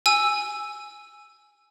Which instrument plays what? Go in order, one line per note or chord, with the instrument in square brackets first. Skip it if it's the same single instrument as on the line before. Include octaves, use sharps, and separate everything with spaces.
[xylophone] G#5 E6